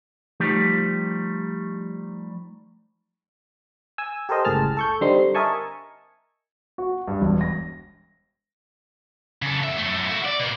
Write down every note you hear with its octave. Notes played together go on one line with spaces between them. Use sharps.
F3 G3 A3 D#4 G4
G#5 E6
G4 A4 A#4 C5 D#5
G1 C#2 A2 G#4 A5 F6
A4 C#6 G6
D3 G3 C4 D#4 C6
A#4 D#5 E5 G#5 A5 C#6
F#4
G2
E1
A#6
C#3 A4
F2 E5
F#2 A3
E4 F#4
D5
B2 A#3